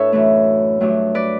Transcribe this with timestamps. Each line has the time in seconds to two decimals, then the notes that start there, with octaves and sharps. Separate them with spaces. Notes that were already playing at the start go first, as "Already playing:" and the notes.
Already playing: A2 D4 E4 A4 B4 C#5
0.12 F#2 E3 A3
0.80 G2 F#3 A3 D4
1.15 B4 D5